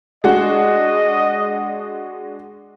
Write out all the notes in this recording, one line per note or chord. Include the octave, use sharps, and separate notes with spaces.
G#3 D4 F#4 D#5